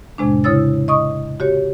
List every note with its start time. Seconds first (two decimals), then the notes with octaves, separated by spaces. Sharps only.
0.18 F2 A2 C3 G#3 D4
0.44 C#3 E4 C#5 D#6 E6 A6
0.88 D#5 C#6 D#6
1.40 F#4 G4 C#5